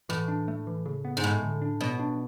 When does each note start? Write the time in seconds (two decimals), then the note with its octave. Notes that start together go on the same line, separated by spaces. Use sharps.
0.09 A2 E3
0.28 D4
0.48 A3
0.67 E3
0.86 C#3
1.05 B3
1.17 G#2
1.23 A2 G#3
1.43 D3
1.62 D4
1.81 B2 F#3
1.99 D4